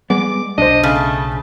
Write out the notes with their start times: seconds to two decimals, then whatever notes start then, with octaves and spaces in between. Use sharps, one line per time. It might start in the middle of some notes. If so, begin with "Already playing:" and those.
0.10 G3 G#3 B3 D6
0.58 B1 D4 C5 D#5
0.83 C#3 A3